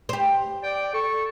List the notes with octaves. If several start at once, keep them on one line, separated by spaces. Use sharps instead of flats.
G4 C5
D5 G5
A4 C#6